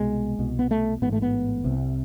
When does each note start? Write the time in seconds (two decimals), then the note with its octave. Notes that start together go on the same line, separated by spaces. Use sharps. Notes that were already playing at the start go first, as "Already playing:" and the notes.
Already playing: C2 B2 G#3
0.39 C2 B2
0.59 B3
0.71 A3
1.02 A1 G#2 B3
1.13 A3
1.22 B3
1.64 C2 C3